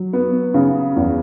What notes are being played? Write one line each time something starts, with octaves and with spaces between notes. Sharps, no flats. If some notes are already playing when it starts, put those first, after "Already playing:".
Already playing: F#3
B3
C#3
E2